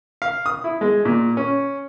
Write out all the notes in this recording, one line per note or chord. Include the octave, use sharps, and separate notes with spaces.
F5
D#6
E4
G#3
A#2
C#4